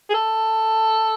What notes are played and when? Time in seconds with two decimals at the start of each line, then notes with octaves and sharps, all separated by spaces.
0.10 G#4
0.14 A4